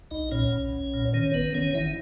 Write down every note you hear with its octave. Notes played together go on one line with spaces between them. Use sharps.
B1 D#4 D#5
A#2 C#4 C#5
B1
B1
A#2
D#3 C#4 C#5
F#1 B3 B4
D#3 C#4 C#5
D#3 E4 E5